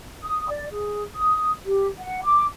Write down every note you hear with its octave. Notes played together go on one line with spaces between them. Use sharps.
D#6
D5
G#4
D#6
G4
F#5
D6